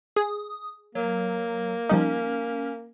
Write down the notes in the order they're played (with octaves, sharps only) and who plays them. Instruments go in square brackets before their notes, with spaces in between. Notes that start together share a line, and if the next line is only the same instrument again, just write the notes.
[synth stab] G#4 [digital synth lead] D#6
[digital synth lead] F#3 [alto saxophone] A#3
[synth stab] F3 G3 D#4 [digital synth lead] C#4